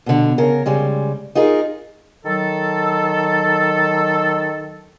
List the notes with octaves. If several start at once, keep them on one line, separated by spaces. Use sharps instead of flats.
B2 D3
C#3 A#4
C#3 G3 G#3
D#4 F4 G#4 A#4
D#3 F#3 A4